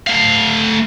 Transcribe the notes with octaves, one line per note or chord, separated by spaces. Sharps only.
A3 F5